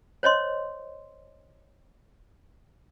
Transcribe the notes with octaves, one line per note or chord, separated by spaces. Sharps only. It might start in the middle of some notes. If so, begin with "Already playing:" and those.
C5 C#5 D#5 C6